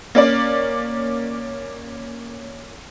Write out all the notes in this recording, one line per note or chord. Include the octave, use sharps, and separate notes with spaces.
A#3 C#4 D5